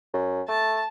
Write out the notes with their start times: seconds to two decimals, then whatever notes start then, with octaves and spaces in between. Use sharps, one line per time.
0.14 F#2
0.48 A3 A5